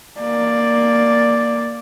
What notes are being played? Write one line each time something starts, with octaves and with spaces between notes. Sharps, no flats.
A#3 D5